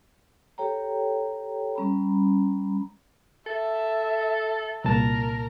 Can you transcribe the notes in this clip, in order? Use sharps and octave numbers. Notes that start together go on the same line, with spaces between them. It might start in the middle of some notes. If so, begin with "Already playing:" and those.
G4 A4 C#5 G5 A#5
G3 C#4 A#5 B5
A4 E5
C2 A#2 A#4 A5